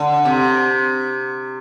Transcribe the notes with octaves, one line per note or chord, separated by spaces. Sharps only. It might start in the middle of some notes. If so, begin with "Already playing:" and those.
Already playing: D3
C3